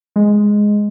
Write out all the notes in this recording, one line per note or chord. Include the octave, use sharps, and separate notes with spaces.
G#3